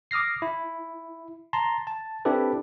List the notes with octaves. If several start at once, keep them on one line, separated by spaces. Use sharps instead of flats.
D6 D#6 F6 A#6 C7
E4
A5 A#5 C6
A5
C4 D4 E4 G4 A4 B4